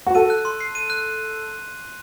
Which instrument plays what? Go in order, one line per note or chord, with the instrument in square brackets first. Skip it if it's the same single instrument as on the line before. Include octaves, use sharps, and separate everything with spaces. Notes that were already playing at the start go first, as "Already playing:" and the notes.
[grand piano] F#4
[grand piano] A4 [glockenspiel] D#7
[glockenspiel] F#6
C6
C7
D#7
F#6